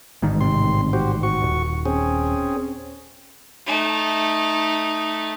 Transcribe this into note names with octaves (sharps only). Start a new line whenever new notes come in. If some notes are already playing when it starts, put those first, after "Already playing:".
A1 G#2 D#3
C3 C6
F#4 G4 C5
F#4 C#6
D#1
C4 C#4 G#4
A3 D#4